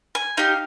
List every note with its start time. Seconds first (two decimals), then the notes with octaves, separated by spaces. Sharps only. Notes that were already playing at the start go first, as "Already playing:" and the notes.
0.15 G#5
0.37 D#4 G4 F5